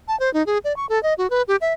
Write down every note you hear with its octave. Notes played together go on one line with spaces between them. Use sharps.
A5
C5
D#4
G#4
D5
C#6
A4
D#5
F#4
B4
G4
E5